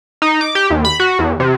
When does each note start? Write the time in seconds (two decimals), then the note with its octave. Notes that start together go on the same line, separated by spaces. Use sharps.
0.22 D#4
0.41 D6
0.55 G4
0.70 D#2
0.85 B5
1.00 F#4
1.19 E2
1.40 C3